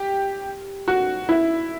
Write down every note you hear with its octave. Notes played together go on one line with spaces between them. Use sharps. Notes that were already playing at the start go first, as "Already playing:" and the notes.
Already playing: G4
F#4
E4